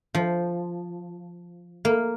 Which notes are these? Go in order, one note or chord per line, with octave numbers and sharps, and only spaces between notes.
F3
A#3